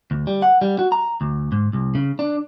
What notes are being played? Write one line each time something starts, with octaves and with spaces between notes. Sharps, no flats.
D2
G3
F#5
G3
F#4
A#5
D2
G#2
C2
C#3
D4